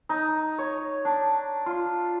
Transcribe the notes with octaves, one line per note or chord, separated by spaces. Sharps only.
D#4
C#5
D4
F4